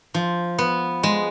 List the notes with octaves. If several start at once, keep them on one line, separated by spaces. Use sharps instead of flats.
F3
B3
G#3